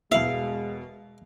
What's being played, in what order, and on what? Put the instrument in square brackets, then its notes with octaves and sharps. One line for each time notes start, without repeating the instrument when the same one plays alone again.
[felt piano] E1 B2 [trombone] G#3 [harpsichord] E4 E5 [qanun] F5